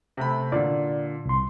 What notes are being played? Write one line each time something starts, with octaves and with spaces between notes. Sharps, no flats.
C3 A3 B5
A#2 D3 D5
C2 C6